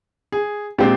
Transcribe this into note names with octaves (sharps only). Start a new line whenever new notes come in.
G#4
A#2 G#3 C4 G4